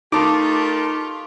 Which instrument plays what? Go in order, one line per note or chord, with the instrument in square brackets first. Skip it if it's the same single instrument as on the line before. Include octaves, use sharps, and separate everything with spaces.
[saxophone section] A3 G4 A#4 [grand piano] D#4 A5 [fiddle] F4 [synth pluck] D6